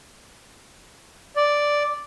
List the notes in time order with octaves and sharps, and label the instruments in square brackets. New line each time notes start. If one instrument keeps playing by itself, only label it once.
[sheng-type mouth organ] D5